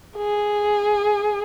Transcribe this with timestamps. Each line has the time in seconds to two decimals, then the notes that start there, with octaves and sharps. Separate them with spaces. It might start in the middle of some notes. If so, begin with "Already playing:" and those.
0.16 G#4